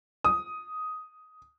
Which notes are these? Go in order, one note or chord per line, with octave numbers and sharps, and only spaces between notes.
D#6